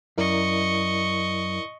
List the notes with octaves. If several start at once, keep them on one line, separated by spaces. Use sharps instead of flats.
F#2 E4 A#4 D5 D#5 C#6